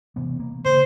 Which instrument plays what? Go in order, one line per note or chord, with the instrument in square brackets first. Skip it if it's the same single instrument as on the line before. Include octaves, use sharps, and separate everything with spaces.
[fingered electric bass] C3 E3 B3
A#3
[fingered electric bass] C#3 [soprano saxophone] C5